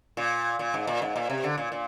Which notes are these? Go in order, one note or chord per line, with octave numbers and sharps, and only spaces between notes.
A#2
A#2
G#2
A#2
G#2
A#2
C3
D3
A#2
A#2